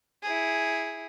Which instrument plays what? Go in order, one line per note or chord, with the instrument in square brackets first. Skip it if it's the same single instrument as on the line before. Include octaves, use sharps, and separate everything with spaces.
[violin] E4 G#4